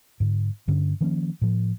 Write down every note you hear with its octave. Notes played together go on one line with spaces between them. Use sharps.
G#2 D3
G2 D3 C#4
D#3 F3 A#3 C#4
A2 F3